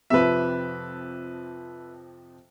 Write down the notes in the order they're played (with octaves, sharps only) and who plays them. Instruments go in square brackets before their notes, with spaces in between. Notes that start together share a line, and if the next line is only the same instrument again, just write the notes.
[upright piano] F2 C3 F3 [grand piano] B4 E5